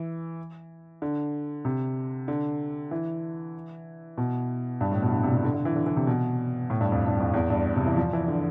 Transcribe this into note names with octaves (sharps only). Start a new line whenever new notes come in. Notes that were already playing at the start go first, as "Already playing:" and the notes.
Already playing: E3
D3
C3
D3
E3
B2
G2
A2
B2
D3
C3
C3
D3
D3
E3
D3
E3
C3
B2
A2
G2
F2
G2
F2
E2
G2
C3
E3
F3
E3
D3